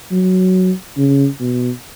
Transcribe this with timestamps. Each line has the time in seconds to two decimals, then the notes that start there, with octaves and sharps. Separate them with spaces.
0.11 F#3
0.97 C#3
1.40 B2